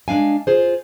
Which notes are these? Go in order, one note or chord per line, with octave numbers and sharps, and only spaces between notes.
G#3 D4 F5 G#5
F4 G#4 C5